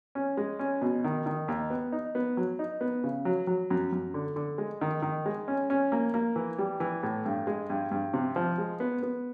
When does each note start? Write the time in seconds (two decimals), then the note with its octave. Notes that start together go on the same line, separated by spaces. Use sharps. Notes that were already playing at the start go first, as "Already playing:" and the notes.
0.15 C#4
0.37 G#3
0.59 C#4
0.81 B2
1.04 D#3
1.26 D#3
1.48 D#2
1.70 B3
1.92 D#4
2.15 B3
2.37 F#3
2.59 D#4
2.81 B3
3.04 C#3
3.25 F#3
3.47 F#3
3.70 F#2
3.92 F#2
4.14 D3
4.36 D3
4.58 G#3
4.81 D#3
5.02 D#3
5.26 G#3
5.48 C#4
5.70 C#4
5.92 A#3
6.14 A#3
6.36 E3
6.58 G3
6.80 E3
7.03 A2
7.25 G2
7.47 G#3
7.70 G2
7.91 G2
8.14 C3
8.36 F3
8.58 G#3
8.80 B3
9.03 B3